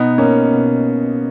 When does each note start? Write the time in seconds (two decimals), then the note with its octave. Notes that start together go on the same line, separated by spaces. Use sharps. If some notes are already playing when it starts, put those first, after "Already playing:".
Already playing: B2 B3 D#4
0.18 A#3 C#4
0.53 B2